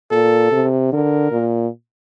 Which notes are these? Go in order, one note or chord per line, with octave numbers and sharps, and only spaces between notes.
A#2 A4
C3
D3 A#4
A#2